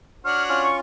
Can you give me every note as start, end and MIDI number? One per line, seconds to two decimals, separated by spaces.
0.25 0.69 62
0.25 0.69 66
0.25 0.69 73
0.25 0.43 89
0.49 0.80 61
0.49 0.80 65
0.49 0.62 89
0.63 0.77 85